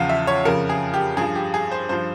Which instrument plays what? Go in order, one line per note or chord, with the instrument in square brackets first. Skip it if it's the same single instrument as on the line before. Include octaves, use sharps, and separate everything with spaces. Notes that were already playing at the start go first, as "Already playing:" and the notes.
Already playing: [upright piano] E2 C#3 F3 F5
E5
C#5
F2 C#3 F3 A#4
G#4
G4
G2 F3 G#4
G4
G#4
C5
G2 F3 C5